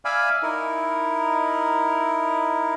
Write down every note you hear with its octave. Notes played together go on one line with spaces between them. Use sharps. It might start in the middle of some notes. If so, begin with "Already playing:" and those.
D5 E5 F5 G#5 B5
D#4 E4 A#4